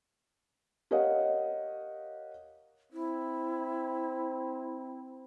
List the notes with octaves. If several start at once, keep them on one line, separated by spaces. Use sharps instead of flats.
G4 A#4 C#5 D#5 F5 F#5
C4 E4